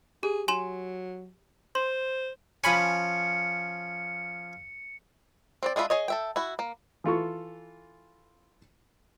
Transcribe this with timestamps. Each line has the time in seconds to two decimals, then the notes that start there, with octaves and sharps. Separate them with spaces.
0.23 G4 G#4
0.48 F#3 G#5 C6 E7
1.75 C5 C6
2.64 F3 C#4 G#5 B5 C#7
5.63 C4 D4 D5
5.76 G#3 D4 F4 E5 B5
5.90 G#4 C#5 D#5
6.08 A4 E5 G5
6.36 E4 F#4
6.59 A#3
7.04 E3 F4 A4 C#6